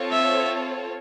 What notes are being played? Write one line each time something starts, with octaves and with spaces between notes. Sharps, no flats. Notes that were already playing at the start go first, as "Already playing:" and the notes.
Already playing: C4 F4 A4 C#5
E5